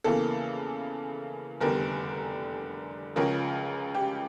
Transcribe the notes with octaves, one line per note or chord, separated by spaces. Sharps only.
E2 C#3 E3 A#3 A4
F1 E2 D3 G3 A#4
C#2 C#3 F3 C#4 A#4
G4